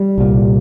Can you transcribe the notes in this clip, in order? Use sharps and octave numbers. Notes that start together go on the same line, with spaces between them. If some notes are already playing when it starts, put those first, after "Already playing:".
Already playing: G3
C2 A#2